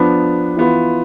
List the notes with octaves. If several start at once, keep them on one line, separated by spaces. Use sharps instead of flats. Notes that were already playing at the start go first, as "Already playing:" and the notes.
Already playing: F3 B3 D4
E3 B3 F4